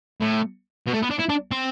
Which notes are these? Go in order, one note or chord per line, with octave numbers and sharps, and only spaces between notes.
A2
B2
A3
B3
D4
E4
D4
C4